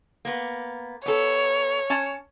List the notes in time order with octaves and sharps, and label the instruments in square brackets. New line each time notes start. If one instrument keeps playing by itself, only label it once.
[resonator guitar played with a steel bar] A#3 B3
[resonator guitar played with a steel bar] B3 A4 [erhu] C#5
[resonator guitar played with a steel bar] C#4 A5